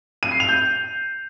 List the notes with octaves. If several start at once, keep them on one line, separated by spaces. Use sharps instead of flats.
D#7
C7
F7
G6